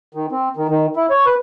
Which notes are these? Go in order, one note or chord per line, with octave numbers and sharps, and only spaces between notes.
D#3
C4
D#3
D#3
E4
C#5
B4